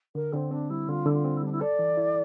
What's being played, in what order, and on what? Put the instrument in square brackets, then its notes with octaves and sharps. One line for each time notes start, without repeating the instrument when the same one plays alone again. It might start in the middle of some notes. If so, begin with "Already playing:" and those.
[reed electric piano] D3 [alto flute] A#4
[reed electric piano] D3 [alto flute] C4
[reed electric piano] C4 [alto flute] D4
[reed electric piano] G3 [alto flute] E4
[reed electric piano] D3 [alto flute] F4
[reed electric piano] D3 [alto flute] E4
[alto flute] F4
[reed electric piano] C4
[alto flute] E4
[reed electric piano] G3 [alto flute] D4
[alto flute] E4
[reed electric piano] A4 [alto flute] D5
[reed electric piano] E3
E4